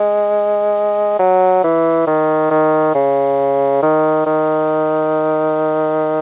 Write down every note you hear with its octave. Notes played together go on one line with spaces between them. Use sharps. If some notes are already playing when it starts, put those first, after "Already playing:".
Already playing: G#3
F#3
E3
D#3
D#3
C#3
D#3
D#3